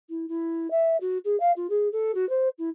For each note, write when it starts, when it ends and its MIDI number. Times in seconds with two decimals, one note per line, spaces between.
0.09 0.26 64
0.28 0.70 64
0.70 0.97 76
1.00 1.18 66
1.24 1.38 68
1.40 1.51 77
1.56 1.67 65
1.70 1.88 68
1.92 2.11 69
2.14 2.28 66
2.29 2.48 72
2.58 2.69 64